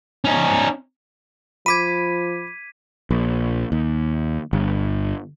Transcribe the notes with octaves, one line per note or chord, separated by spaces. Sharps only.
C#4 D#4
F3 B5 D6 G#6 B6 D#7
A#1
D#2
G1